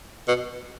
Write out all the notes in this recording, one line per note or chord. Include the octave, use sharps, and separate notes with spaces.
B2